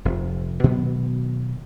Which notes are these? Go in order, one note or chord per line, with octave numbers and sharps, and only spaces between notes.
F1 C3 F3
B2 D#3 F#3 B3